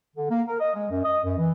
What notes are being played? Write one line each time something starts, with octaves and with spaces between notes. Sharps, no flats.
D3
A#3
A#4
D#5
G#3
F#2
D#5
F#2
E3